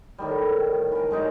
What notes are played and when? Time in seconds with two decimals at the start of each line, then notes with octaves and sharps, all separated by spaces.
0.18 A2 D#3 G3
0.92 E3 A#4
1.11 F#2 G#3 D#4 D5